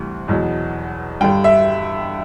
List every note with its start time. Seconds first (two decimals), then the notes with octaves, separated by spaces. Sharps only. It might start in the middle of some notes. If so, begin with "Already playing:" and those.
Already playing: D2 C3 E3 G3
0.28 E2 B2 F#3
1.21 G2 D3 G3 G5
1.44 E5